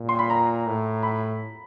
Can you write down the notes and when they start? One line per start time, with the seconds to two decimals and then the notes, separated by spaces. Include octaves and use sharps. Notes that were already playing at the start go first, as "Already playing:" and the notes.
Already playing: A#2
0.09 C6
0.19 B5
0.30 A#5
0.66 A2
1.03 B5